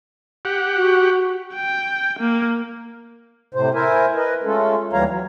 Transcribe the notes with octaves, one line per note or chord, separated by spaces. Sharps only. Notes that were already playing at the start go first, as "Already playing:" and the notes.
G4 F#5
F#4
G5
A#3
A2 C3 C5
E4 A#4 C5 E5 G#5
A#4 B4 D#5
G#3 A3 C#4 F4 A4
D#2 E3 G3 C#5 F5 A#5
F#3